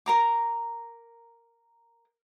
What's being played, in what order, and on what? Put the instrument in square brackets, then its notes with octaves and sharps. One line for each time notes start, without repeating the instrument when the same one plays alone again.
[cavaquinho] A#4 A#5 D6